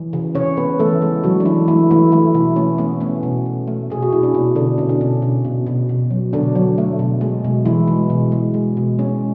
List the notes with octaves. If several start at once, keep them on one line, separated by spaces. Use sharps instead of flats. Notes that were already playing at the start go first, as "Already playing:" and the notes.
Already playing: E3
C#3
C#3 C#4 C#5
C#3 B3 B4
E3 A3 A4
G#3
C#3 F#3 F#4
D4
E3 E4
E3 A3 E4
E3 A3 E4
E3 A3 E4
B2 E3 E4
A3 C#4
A3 B3
A3 C#4
B2
B2
A3
B2 G#4
F#4
B2 E4
D4
B2 C#4
B2 D3 D4
B2 C#4
D4
B2 C#4
B2
B2
B2
B2
F#3
B2 D3 D4
F#3
A3
B2
G#3
B2
E3 G#3 E4
G#3
B2
G#3
G#3
B2
G#3 C#4